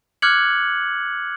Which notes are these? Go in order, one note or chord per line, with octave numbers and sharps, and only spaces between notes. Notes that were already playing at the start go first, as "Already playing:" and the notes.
D6 F6 F#6 G#6 C#7 F#7